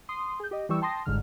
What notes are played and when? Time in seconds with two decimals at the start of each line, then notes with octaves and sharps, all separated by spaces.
0.09 C6 D#6
0.40 G#4 G6
0.51 G4 D#5
0.69 E3 G3 G4 C#6 E6
0.81 G5 A5 C6 D#6 A#6
1.06 G1 G#2 D3 F6